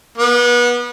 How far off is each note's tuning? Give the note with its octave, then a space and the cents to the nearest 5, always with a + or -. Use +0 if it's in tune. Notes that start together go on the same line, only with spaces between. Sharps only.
B3 -30